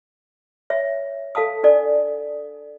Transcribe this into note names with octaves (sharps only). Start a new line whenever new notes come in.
C#5 E5
A4 F5 A5 D#6
D4 A4 D5